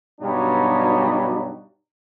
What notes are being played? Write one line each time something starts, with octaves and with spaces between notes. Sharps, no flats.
G2 B2 F#3 G3 D#4